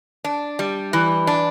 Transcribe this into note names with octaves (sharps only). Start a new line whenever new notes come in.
D4
G3
E3
D4